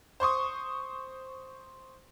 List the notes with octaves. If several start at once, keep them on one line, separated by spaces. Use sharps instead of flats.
C5 C6 C#6 D#6